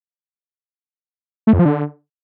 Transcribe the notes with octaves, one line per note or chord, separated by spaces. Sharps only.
A3
F2
F3
D3